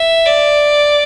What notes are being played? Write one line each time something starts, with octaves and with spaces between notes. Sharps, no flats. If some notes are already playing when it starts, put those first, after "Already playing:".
Already playing: E5
D5